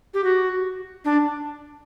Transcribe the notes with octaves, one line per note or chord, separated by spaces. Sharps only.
G4
F#4
D4